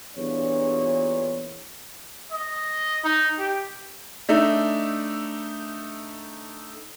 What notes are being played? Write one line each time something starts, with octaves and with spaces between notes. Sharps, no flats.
E2 G2 A#2 C#5
D#5
D#4
G4
A3 D4 D#4 E5